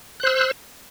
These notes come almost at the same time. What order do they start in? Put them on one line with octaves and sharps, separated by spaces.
F#6 C5 E6